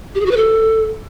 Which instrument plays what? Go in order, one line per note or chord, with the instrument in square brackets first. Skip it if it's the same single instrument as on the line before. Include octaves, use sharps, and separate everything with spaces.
[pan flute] G4
G#4
F#4
B4
A4